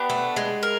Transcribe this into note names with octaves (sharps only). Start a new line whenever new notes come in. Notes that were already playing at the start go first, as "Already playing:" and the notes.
Already playing: B3 D4 G4
A3
G#3
A#4